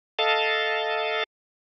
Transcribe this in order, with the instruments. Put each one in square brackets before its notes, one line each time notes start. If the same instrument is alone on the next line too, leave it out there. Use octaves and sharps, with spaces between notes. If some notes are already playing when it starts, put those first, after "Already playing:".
[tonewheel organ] A4 D#5 F5 A5